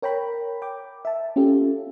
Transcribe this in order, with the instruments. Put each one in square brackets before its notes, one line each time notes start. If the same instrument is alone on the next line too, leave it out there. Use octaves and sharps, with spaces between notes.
[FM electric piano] A#4 C#5 G5 A#5 B5
G5 D6
E5 A5
C#4 F4 G4 A4